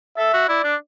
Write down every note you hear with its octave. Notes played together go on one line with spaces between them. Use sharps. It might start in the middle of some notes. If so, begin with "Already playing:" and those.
A4 E5
F#4
E4 D5
D4